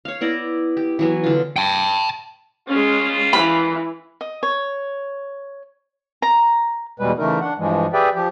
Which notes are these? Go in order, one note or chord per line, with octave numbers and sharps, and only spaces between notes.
C#5 F5
B3 E4 D5 A#5
G4
E3 F#3 B3
D3 F4
G5 A5
D#3 G3 G#3 C#4 F4
E3 B5
D#5
C#5
A#5
E2 B2 G3 G#3 B4
C#3 E3 A3 D#4 A#4
D4 F#5
G2 E3 F3 G#3
G4 G#4 B4 D5 E5 G5
F3 G4